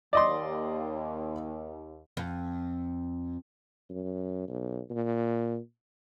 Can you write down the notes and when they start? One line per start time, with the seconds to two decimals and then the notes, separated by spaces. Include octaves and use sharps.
0.13 D#2 D5 D#5 C6
2.17 F2
3.90 F#2
4.48 B1
4.90 A#2